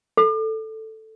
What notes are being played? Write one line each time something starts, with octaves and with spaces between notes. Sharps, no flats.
A4